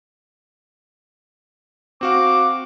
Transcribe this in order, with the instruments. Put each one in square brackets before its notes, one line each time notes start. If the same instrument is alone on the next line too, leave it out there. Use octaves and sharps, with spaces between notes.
[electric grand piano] C4 F#4 F5 [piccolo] D6